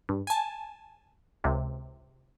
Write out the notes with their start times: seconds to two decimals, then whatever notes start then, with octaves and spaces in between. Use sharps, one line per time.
0.09 G2
0.27 G#5 A5
1.44 C#2 C3